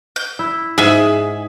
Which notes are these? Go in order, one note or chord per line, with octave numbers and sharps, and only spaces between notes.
G6
E4
G#2 G#4 E5